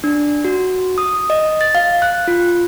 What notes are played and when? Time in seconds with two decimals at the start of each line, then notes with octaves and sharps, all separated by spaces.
0.04 D4
0.45 F#4
0.98 D#6
1.30 D#5
1.61 A6
1.75 F5
2.02 F#6
2.28 F4